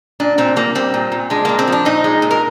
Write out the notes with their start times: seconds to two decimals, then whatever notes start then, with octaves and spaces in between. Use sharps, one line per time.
0.20 A#2 D4
0.38 A#2 C4
0.56 G3 A#3
0.75 G3 C4
0.94 A#2
1.12 A#2
1.30 G#3 D4
1.45 A#2 A#3
1.59 C4
1.67 F3
1.72 D4
1.85 A#2 D#4
2.04 G#3
2.22 A#2
2.31 A#4